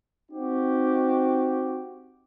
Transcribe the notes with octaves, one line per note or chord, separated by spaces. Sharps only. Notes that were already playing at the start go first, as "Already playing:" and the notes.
C4 D#4 F#4 G4